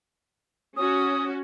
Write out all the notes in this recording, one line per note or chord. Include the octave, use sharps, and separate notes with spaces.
C#4 F#4 D#6